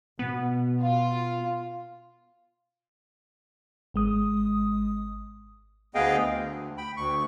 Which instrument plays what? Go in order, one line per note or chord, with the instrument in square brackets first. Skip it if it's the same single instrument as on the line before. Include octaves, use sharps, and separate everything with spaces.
[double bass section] B2 [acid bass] B3
[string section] F4
[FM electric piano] G#1 G#3 D#6
[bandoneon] D2 B3 G#4 D#5 F5 G5
D2
G5 B5
D2 C#6